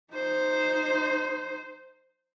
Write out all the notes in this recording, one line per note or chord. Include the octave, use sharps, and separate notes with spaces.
D#4 C5